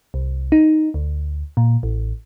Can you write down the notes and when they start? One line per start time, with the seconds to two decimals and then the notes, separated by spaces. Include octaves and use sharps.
0.14 C2
0.52 D#4
0.94 D2
1.57 A#2
1.83 A1